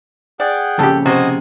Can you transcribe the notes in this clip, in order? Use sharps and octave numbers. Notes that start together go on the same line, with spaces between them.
G#4 D5 F#5 G5
F2 A#2 C#3 G4 A4
C3 F#4 C5 D#5 G#5